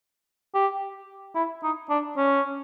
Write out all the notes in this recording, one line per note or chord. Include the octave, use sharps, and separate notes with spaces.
G4
E4
D#4
D4
C#4